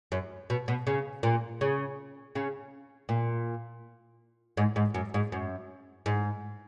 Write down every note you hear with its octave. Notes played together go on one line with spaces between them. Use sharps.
F#2
B2
B2
C#3
A#2
C#3
C#3
A#2
G#2
G#2
F#2
G#2
F#2
G#2